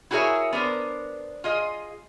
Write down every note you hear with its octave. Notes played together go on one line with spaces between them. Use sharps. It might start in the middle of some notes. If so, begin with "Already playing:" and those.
E4 F#4 G#4 A#4 C#5 E5
B3 D4 A#4 C5
F4 G#4 D#5